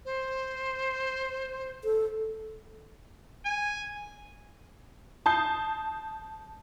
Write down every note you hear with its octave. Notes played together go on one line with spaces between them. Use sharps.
C5
A4
G#5
A5 D#6 G6 C7